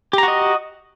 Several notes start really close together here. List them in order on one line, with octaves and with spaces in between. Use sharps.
G4 A#5 F#4 D#5